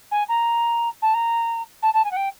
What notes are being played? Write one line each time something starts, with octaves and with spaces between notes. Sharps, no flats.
G#5
A#5
A5
A#5
A5
A5
G#5
F#5
G5